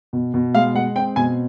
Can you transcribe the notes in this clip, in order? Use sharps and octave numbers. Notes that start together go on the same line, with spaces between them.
B2
B2
G#3 F5
G#3 F#5
C4 G5
B2 G#5